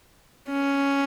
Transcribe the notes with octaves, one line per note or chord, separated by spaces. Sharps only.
C#4